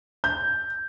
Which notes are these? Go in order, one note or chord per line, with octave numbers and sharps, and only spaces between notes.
G6